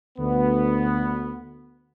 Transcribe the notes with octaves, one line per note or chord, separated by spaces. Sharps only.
D2 B3